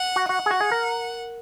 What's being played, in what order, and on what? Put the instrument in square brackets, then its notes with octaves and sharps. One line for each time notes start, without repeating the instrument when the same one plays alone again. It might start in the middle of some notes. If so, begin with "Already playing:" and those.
Already playing: [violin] F#5
[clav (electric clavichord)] F#4
[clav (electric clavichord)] F#4 [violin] F#5
[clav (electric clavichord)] G#4
F#4
G#4
A#4